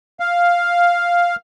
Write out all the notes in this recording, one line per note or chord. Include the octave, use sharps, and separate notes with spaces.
F5